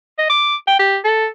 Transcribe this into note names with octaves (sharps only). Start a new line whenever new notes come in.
D#5
D6
G5
G4
A4